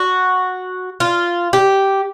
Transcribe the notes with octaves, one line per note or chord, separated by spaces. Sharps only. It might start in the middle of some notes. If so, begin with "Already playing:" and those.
Already playing: F#4
F4
G4